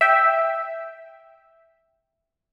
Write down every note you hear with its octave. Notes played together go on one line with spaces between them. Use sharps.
E5 G5